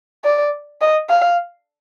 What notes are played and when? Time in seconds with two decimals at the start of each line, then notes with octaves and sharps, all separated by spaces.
0.24 D5
0.82 D#5
1.10 F5